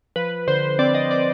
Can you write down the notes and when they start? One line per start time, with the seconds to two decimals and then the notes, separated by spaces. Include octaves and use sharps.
0.16 F3 B4
0.48 D3 C5
0.79 C4 D5
0.95 D#5
1.11 D5